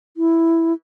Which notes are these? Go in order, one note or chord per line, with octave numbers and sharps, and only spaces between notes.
E4